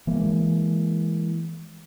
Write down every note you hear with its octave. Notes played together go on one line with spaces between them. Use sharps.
E3 G#3 A#3